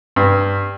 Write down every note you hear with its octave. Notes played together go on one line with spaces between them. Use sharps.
G2